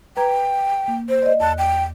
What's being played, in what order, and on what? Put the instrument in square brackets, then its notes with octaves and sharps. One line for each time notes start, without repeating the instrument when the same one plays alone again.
[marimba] B4 A#5 G#6 [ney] G5
[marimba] A#3
[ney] C5
[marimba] D5 D#5
[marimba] E2 F#6 [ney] A5
[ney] G5